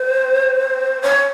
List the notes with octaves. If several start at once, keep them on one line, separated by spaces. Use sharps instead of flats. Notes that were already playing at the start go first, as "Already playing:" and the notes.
Already playing: C5
C#5